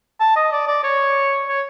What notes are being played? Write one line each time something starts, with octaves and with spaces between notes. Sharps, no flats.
A5
D#5
D5
D5
C#5
C#5